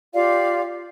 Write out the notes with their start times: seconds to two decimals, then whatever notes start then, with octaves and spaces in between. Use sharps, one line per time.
0.14 F4 G4 D5 F5